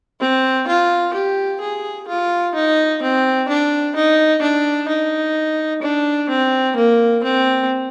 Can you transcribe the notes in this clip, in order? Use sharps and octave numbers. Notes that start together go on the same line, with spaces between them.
C4
F4
G4
G#4
F4
D#4
C4
D4
D#4
D4
D#4
D4
C4
A#3
C4